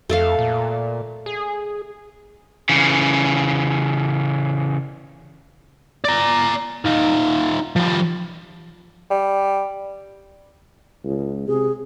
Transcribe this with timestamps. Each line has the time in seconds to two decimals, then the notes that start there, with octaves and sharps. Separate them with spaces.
0.09 F2 A3 A4 F5
0.39 A#2
1.26 G#4
2.69 C#3 E3
6.04 D5 A#5
6.85 D#4 F4
7.76 F3 G3
9.10 G3
11.04 C#2
11.48 C3 G#4